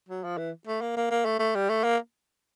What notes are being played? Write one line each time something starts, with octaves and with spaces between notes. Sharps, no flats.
F#3
F3
E3
A3
A#3
A#3
A#3
A3
A3
G3
A3
A#3